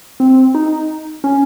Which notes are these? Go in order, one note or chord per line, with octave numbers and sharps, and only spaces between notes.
C4
D#4
C#4